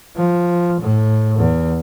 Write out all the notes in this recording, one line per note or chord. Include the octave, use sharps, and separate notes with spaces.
F3
A2
E2